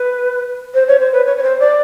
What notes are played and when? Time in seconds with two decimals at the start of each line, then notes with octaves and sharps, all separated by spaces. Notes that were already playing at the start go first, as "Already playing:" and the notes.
Already playing: B4
0.74 C5
0.88 C#5
1.00 C5
1.13 B4
1.26 C#5
1.37 C#5
1.43 C5
1.59 D5